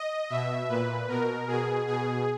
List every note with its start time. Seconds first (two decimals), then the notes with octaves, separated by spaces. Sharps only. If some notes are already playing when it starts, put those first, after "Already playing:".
Already playing: D#5
0.30 B2 E5
0.69 A#2 B4
1.08 B2 A#4
1.48 B2 G#4
1.87 B2 G#4